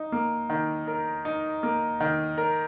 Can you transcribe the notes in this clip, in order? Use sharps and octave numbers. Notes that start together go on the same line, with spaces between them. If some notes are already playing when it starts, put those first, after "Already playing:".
Already playing: D#4
A#3
D#3
A#4
D#4
A#3
D#3
A#4